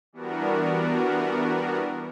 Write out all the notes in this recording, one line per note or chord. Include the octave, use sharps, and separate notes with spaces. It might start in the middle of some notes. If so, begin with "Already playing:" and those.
E3 G3 B3 D4 F#4 A#4